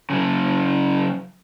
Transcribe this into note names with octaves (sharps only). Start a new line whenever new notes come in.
C#3 F#3